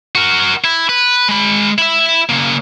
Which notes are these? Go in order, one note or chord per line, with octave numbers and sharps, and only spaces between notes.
F#4 A#4
E4
B4
G#3 B5
E4 E5
C#3 A#3